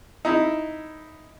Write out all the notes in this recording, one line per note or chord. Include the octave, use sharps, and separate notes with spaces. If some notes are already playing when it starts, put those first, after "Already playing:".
D#4 E4